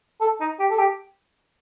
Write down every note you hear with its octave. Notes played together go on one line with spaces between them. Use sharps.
A4
D#4
G4
A4
G4